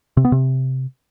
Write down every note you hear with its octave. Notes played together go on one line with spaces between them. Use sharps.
C3
B3
C3